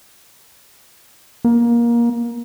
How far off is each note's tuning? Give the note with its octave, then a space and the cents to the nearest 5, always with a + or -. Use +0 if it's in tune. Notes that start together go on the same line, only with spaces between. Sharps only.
A#3 +20